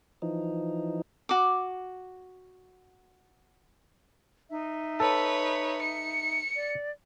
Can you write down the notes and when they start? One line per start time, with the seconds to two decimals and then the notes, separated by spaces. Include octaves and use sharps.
0.22 E3 F3 D#4
1.29 F#4 D6
4.50 D#4 E5
5.00 A4 B4 C#5
5.82 C#7
6.55 D5